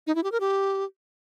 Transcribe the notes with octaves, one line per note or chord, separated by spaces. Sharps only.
D#4
E4
G4
A#4
G4